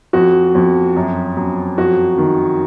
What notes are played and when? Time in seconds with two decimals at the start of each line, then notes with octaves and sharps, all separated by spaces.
0.13 F2 F#4
0.55 F2
0.96 F#2
1.37 F#2
1.78 F2 F#4
2.18 D#3